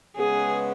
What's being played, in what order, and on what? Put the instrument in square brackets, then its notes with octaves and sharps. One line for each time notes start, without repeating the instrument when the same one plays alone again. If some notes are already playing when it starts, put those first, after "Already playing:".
[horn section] C#3 G#3 B3 [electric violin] G#4